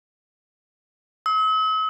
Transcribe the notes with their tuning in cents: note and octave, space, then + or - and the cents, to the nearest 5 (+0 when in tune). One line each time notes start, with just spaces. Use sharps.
E6 -45